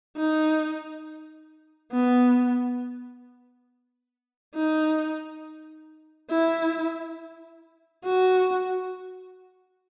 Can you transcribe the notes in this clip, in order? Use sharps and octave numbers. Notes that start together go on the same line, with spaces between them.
D#4
B3
D#4
E4
F#4